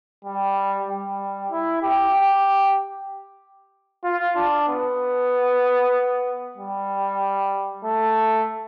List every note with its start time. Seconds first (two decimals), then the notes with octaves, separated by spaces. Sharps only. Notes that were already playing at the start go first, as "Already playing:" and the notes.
0.25 G3
0.88 G3
1.51 E4
1.82 G4
2.15 G4
4.04 F4
4.36 D4
4.68 B3
6.58 G3
7.84 A3